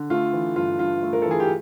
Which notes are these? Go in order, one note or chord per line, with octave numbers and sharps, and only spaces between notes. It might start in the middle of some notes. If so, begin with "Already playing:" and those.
Already playing: D3
A3 F4
E3
G2 F4
G2 F4
A3
A#4
E3 A4
G#4
G4